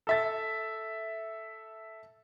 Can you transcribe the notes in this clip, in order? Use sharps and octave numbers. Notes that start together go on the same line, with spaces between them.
A4 E5 A6